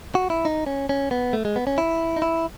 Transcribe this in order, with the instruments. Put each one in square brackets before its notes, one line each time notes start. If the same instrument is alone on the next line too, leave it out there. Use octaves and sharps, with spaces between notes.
[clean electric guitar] F#4
E4
D#4
C#4
C#4
B3
A3
G#3
B3
C#4
E4
D#4
E4